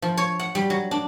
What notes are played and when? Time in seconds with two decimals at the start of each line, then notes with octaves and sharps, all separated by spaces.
0.02 F3
0.17 C#5
0.39 F#5
0.55 G3
0.70 F#3
0.91 D4